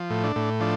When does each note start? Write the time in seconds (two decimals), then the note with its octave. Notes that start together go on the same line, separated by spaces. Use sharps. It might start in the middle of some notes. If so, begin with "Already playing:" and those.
Already playing: F3
0.10 A2
0.24 D4
0.36 A2
0.60 F3 D4